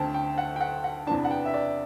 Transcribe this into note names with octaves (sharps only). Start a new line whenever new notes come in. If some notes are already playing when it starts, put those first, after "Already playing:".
Already playing: D2 D3 A3 C4 G5 A5
G5
F#5
G5
F#5
F#5
E2 C3 E3 B3 D4 A5
F#5
G5
E5
D5